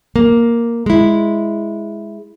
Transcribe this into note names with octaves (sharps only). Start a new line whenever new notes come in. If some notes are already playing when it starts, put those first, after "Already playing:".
A#3
G#3 E4